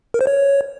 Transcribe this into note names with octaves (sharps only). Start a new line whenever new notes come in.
A#4
C5
C#5